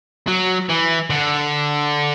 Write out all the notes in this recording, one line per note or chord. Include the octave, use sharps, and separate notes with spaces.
F#3
E3
D3